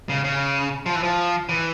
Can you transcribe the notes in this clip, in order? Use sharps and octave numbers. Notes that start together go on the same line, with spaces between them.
C#3
C#3
F3
E3
F3
E3